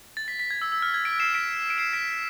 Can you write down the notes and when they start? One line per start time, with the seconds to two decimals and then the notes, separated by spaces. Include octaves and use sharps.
0.17 A6
0.28 B6
0.39 B6
0.51 G#6
0.62 E6
0.72 E6
0.82 F6
0.94 G#6
1.05 B6 D7
1.20 C7 E7
1.34 B6 D7
1.70 D7
1.78 C7 E7
1.93 B6 D7